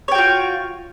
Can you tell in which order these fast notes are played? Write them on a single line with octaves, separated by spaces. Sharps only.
C#5 G5 F#4 F4